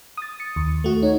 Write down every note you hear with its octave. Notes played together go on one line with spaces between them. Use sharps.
D#6 A6
C#7
D#2
A3 F#4
D#4 C#5